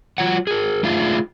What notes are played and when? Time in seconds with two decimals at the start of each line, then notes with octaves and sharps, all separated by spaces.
0.18 F#3 F4 C#5 F#5
0.47 G#4 A#4
0.83 A3 D4 D#4 F4 G#4 E5